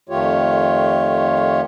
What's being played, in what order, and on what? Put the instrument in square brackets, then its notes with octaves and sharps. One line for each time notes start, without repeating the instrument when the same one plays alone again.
[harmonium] F2 D#3 A3 F4 G4 C#5